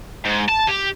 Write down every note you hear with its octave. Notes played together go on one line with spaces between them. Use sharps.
G#2
A5
G4